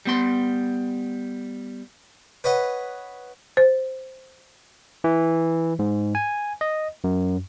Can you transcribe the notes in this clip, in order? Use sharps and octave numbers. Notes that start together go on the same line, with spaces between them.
G3 B3 C6
B4 C#5 D#5 F#5
C5
E3
G#2
G#5
D#5
F#2